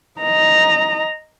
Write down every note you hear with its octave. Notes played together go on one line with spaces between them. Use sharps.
D#5 A#5